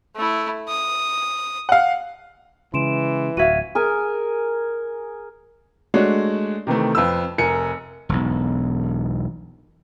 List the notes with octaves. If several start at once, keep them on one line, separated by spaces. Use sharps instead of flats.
A3 E4
D#6
F5 F#5
C#3 E3 G#3 C6 D7 E7
D1 F#4 E5 F5 G#6 D#7
G#4 A#4 G#5
G#3 A3 D4 F#4 C#5
C3 D#3 E3 A3
F2 F3 B4 E6
F1 A#4 G#5 C#7
E1 B1